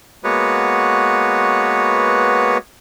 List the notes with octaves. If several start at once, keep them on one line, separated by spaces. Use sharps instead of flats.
G#3 A#3 B3 F#4 B4 C#5